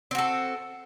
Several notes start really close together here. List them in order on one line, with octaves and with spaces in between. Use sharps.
C4 F#4 A4